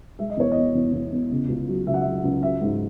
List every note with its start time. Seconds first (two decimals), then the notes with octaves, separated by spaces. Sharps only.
0.19 G#3 E5
0.30 D#5
0.37 E2 C#5
0.52 E2 D#5
0.75 E2
0.93 E2
1.12 E2
1.31 C#3
1.49 C#2
1.68 F#3
1.86 C#2 E5
1.94 F#5
2.01 E5
2.06 F#3
2.24 C#2
2.42 F#3 E5
2.61 G#2